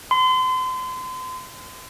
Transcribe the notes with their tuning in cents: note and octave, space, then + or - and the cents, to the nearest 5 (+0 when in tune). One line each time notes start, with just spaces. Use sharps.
C6 -35